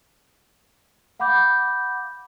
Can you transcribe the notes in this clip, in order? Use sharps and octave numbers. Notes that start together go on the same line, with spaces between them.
F5 F#5 B5 D6 G6